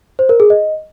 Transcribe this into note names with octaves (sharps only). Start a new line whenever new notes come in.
C5
A#4
G#4
D#5